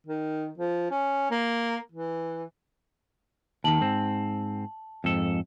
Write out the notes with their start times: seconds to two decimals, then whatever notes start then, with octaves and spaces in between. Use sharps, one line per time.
0.06 D#3
0.58 F3
0.91 C#4
1.31 A#3
1.92 E3
3.64 D#2 D#3 A5 F#7
3.81 G#2 C4
5.04 F2 G#2 A4